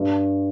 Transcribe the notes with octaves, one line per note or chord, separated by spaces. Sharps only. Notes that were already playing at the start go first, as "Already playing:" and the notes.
Already playing: G2